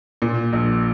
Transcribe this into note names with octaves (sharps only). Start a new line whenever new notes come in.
A#2
A#1